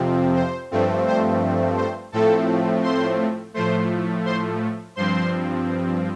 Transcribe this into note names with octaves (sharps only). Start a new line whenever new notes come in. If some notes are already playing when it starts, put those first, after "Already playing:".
Already playing: F2 C3 F3 C4
C5
G2 F3 A3 C4
C5
C5
A2 F3 A3 C4 A4
C5 C6
A2 F3 A3 C5 C6
C5 C6
G2 F3 C4 C5 C6